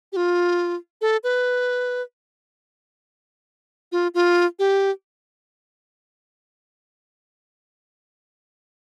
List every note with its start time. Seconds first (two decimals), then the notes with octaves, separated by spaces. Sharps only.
0.12 G4
0.16 F4
1.01 A4
1.24 B4
3.92 F4
4.14 F4
4.59 G4